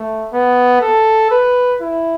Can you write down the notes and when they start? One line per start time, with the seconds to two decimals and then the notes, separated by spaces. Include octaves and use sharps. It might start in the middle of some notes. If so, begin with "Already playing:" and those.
Already playing: A3
0.33 B3
0.82 A4
1.31 B4
1.81 E4